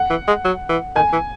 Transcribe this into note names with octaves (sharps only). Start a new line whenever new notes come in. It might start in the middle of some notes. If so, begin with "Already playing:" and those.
Already playing: F#5
E3
G#3
F#3
E3
D#3 G#5
E3